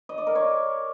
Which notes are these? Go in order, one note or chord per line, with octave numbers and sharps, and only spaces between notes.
D#5
D5
A#4
C#5